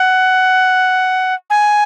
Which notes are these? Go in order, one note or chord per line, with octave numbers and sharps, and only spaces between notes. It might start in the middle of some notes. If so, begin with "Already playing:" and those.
Already playing: F#5
G#5